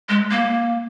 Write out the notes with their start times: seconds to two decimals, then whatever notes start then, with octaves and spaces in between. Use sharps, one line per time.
0.09 G#3
0.31 A#3